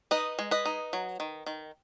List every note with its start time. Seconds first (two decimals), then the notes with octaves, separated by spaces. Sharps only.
0.11 D#4 B4 D#5
0.39 G#3
0.51 B4 D#5
0.65 D#4
0.93 F#3
1.20 D#3
1.46 D#3